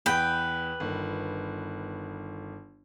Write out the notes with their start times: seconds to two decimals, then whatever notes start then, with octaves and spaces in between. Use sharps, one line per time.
0.06 E2 B4 G5
0.80 G1 D#3